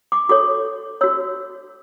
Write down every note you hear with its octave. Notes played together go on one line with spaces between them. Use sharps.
D6
F#4 A4 C#5 D6
F#4 C#5 E6